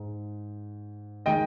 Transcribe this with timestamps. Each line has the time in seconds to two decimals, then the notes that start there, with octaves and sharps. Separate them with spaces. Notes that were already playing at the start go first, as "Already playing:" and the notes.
Already playing: G#2 G#3
1.26 D#3 G#3 D#4 D#5 G5